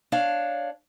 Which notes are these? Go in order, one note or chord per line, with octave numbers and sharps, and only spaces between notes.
D4 C#5 F5